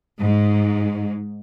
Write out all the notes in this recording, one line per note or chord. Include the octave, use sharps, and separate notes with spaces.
G#2